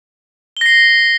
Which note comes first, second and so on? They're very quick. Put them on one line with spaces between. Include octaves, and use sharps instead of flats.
G7 A#6 C7